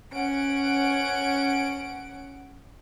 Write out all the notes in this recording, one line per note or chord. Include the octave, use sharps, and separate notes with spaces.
C#4 F#5 D7